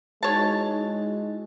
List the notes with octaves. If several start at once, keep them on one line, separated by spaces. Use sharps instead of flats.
G#3 D#4 E4 F#4 C#5 A5